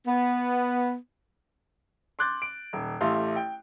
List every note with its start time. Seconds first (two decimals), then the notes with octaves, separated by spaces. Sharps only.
0.07 B3
2.19 C6 D6 F#6 G6 A6
2.42 D7
2.73 D#1
3.01 A1 A3 G4 F5 C6
3.36 G5